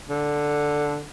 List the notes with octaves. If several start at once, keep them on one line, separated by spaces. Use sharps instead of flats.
D3